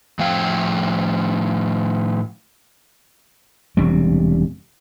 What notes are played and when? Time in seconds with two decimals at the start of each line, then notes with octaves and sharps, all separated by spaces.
0.19 A2 F3 F5 G5
3.77 E1 C3 G3